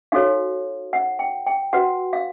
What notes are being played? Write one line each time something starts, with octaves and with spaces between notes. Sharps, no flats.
D#4 F#4 A4 C#5 F5
F#5
G5
G5
F#4 B4 F#5
F5